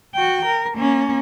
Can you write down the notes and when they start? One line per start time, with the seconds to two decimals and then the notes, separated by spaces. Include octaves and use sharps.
0.14 F#4 G5
0.46 A#4
0.76 A#3 C#4